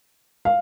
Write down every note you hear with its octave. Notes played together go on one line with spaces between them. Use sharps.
F5